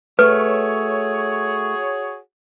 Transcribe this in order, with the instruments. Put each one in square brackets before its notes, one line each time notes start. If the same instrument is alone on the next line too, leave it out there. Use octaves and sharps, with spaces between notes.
[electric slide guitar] A3 [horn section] F#4 G#4 C#5 [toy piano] B4